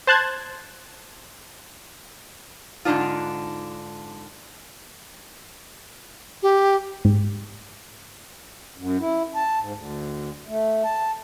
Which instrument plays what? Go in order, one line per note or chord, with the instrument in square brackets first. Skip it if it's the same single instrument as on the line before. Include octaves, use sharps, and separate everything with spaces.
[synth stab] C5 A5 F#6 G#6
[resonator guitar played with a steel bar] G#2 D3 D#3 D4 D#4 F4
[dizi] G4
[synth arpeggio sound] G#2
[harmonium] F#2
E4
A5
G#2
D2
A3
A5